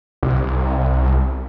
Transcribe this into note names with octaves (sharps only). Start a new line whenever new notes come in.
C2